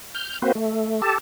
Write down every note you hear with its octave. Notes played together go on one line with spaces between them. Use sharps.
F6 G6
A#3 C4 F#4 B4 C5
A3
G4 A4 A5